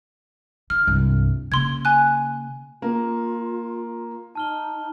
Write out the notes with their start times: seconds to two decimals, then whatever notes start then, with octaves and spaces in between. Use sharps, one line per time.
0.70 D#3 F6
0.87 C2 G2
1.52 C#3 A#3 C6 G#6
1.85 G#5 F#6
2.82 A#3 F4
4.35 D#4 A5 F6 G7